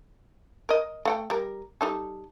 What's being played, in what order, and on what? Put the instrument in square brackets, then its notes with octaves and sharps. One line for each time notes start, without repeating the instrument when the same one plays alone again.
[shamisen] A#4 D#5
A3 F#5 G5
G3 A#4
G3 D#4 A4